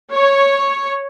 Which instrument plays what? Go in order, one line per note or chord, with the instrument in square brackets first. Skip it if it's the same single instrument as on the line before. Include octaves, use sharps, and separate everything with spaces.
[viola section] C#5